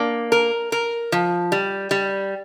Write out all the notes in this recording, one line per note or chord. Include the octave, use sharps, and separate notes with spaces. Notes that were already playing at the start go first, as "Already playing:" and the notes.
Already playing: A#3 D4
A#4
A#4
F3
G3
G3